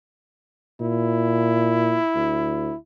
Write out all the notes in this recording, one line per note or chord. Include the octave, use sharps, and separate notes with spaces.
A#2 E4
D2